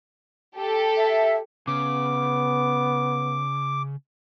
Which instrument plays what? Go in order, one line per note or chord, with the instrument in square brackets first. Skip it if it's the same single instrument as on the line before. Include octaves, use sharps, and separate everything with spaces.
[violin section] G4 A4
[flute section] E5
[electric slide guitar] C#3 [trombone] B3 [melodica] D6